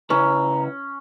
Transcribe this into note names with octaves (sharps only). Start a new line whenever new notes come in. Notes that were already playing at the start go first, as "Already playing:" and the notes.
C#3 C#4 E4 B4 A#5